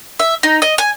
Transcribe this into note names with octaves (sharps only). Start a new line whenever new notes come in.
E5
D#4
D#5
G#5